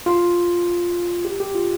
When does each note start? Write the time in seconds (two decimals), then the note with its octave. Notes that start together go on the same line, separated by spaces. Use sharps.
0.06 F4
1.25 G4
1.40 G4
1.55 F4